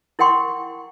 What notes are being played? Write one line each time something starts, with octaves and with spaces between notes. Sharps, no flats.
E4 A#4 F#5 G5 C6 C#6